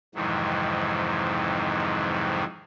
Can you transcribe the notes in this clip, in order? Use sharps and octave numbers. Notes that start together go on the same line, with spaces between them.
F2 G#2 C3 D#3 E3 F#3